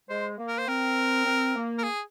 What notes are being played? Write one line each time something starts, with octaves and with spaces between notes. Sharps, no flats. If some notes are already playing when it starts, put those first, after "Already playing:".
G#3 C5
A#3
A#4
C5
C4 A#4
C4
A#3
A#4
G#4